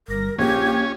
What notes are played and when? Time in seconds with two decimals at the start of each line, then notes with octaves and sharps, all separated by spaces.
0.08 G1 A#4 A#6
0.38 A#1 C#4 G4 G#6